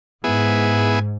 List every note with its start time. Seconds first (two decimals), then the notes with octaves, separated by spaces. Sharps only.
0.24 G#2 B3 E4 G#4